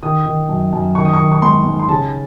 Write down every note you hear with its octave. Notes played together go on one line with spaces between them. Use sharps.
D#3 D#6
D#3
F#2
F#2
D#3 C#6
D#6
C#6
D#3
C#6
G#2 C6
G#2
C6
C#3 A5